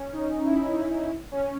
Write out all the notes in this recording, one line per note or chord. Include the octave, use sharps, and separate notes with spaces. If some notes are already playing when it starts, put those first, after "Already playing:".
Already playing: C#4
D#4
E4
C#4